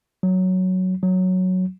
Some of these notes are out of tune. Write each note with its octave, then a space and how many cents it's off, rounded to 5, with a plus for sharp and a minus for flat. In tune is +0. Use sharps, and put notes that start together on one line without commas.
F#3 +5
F#3 +0